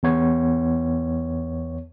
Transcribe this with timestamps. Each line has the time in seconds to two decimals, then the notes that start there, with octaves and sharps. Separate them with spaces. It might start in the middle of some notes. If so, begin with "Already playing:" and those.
0.03 E2 B3 C#5